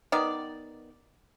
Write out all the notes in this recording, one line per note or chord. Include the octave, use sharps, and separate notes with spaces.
D#3 B3 D5